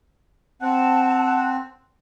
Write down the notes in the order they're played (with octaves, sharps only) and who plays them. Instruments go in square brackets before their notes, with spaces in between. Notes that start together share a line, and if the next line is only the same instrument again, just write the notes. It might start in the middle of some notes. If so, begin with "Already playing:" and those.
[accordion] C4 [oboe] F#5 [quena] A5